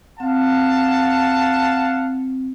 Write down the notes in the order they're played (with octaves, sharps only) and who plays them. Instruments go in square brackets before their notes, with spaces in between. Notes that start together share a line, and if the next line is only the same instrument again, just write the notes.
[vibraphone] C4 [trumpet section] F5 F#5 A5